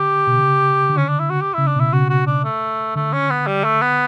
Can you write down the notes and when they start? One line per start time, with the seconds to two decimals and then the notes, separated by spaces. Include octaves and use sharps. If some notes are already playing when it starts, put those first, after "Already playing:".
Already playing: D3 G4
0.27 B2
0.39 C#3
0.90 D3
0.97 C#4
1.08 D4
1.19 E4
1.30 F#4
1.41 G4
1.54 C#3 E4
1.67 D4
1.76 B2
1.80 E4
1.93 C#3 F#4
2.10 F#4
2.27 D4
2.44 A3
2.95 D3 A3
3.13 C#4
3.30 B3
3.47 G3
3.64 A3
3.82 B3